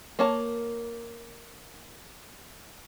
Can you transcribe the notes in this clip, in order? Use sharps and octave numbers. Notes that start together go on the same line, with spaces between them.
A#3 C#5 A5